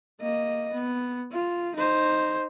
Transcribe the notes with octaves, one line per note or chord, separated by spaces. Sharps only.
A#3 D#5
B3
F4
D#4 C5